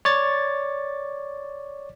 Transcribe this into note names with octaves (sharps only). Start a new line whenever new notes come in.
C#5 D5 A6